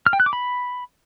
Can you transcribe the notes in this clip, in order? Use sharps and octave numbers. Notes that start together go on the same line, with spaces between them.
F6
G5
F#6
D6
B5